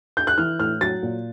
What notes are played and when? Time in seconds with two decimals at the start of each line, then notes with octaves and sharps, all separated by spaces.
0.17 G6
0.27 F#6
0.38 E3 F6
0.59 A2 F6
0.81 F#3 A6
1.02 A#2